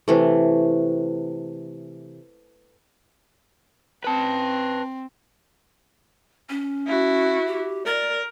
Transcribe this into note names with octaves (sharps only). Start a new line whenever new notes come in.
C3 E3 A3
C4 B4 A5
C#4
E4 F#4
G4
A#4 D5